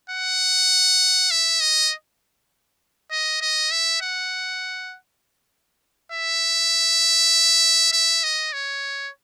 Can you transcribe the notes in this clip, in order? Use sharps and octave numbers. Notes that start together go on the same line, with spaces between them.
F#5
E5
D#5
D#5
D#5
E5
F#5
E5
E5
D#5
C#5